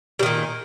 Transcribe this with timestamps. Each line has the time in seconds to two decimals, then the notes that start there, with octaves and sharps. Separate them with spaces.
0.19 G3
0.23 D#3
0.26 A#2